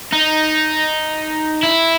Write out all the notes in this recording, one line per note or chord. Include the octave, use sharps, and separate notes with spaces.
D#4
E4